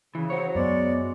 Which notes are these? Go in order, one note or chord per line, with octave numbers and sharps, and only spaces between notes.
C#3 E3
F#4 C5 C#5
F#2 G#3 B3 D5